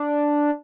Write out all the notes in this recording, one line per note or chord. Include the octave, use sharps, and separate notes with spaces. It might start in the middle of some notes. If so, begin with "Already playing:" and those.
Already playing: D4